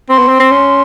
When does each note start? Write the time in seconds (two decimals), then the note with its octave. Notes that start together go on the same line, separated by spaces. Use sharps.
0.09 C4 C6
0.18 B3
0.28 C4
0.39 C4
0.51 C#4